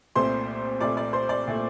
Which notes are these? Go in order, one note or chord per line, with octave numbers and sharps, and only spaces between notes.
C2 A#2 A3 C5 C6
C2 A#2 A3 D5 D6
D5 D6
C5 C6
D5 D6
A#2 A3